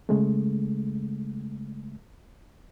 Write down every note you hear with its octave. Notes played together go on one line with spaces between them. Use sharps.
C#3 G#3 A3